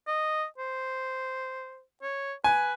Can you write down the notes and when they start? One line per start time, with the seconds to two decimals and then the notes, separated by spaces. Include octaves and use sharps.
0.07 D#5
0.58 C5
2.02 C#5
2.44 B4 G#5